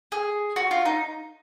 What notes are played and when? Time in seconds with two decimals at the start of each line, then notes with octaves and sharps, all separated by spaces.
0.12 G#4
0.56 F#4
0.71 F4
0.85 D#4